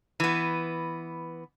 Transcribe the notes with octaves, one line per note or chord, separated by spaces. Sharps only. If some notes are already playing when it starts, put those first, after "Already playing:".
E3 B3